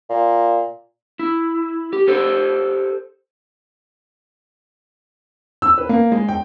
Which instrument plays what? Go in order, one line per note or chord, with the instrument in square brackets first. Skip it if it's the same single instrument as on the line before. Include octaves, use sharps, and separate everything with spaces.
[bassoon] A#2
[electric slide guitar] E4
G4
G4 A4 C5
[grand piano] E6
B4
A#3
G#3
G5